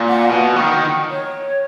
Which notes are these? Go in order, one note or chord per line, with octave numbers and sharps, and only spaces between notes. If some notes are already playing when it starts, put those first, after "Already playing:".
Already playing: A#2
F#5
B2
D#3
C#5